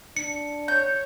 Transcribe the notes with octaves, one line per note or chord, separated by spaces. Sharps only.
D4 C#7
C#5 G6